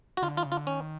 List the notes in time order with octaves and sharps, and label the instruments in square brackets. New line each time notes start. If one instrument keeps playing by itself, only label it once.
[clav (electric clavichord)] F#4
[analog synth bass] D3 [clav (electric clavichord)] F4
[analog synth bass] D#3 [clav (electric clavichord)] F4
[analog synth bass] C#3
[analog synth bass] D3 [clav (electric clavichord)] F4
[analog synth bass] D#3 [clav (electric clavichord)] C#4